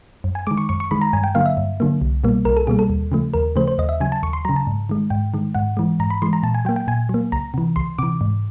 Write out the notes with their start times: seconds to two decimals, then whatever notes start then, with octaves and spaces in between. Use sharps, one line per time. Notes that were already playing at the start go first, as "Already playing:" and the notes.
0.24 F#2
0.35 G#5
0.47 D#3 G#3 D6
0.58 C#6
0.69 F#2 C#6
0.80 C#6
0.91 D#3 G#3 B5
1.01 A#5
1.13 G2 G#5
1.24 G5
1.35 D3 F#3 A#3 F5
1.46 E5
1.57 G2
1.80 D3 F#3 A#3
2.02 C2
2.24 B2 G3 A#3
2.45 C2 A#4
2.57 A4
2.67 B2 G3 A#3 G#4
2.79 A4
2.90 D#2
3.12 C#3 F3 A3
3.34 D#2 A#4
3.56 C#3 F3 A3 C5
3.68 C5
3.78 D#2 D#5
3.89 E5
4.00 C#3 F#3 G#5
4.12 A5
4.23 D#2 C#6
4.33 C6
4.45 C#3 F#3 A#5
4.56 A5
4.67 G#2
4.89 D#3 G#3
5.10 G#2 G5
5.34 D#3 G#3
5.55 G#2 F#5
5.77 E3 G#3
6.00 G#2 A#5
6.10 B5
6.22 E3 G#3 C6
6.33 A#5
6.43 A#2 A5
6.55 G#5
6.65 F#3 G5
6.69 A#3
6.76 G5
6.87 A#2 G#5
7.09 F#3 A#3
7.32 C#2 A#5
7.54 C3 E3
7.76 C#2 C6
7.99 C3 E3 D6
8.21 G#2